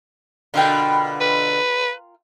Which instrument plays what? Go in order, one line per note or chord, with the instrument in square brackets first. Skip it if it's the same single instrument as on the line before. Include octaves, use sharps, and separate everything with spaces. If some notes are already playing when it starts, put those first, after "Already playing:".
[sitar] B2 D3 [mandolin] F4 A#4 G5
[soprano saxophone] B4